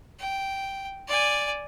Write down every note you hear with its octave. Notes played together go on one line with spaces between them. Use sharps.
G5
D5 G#5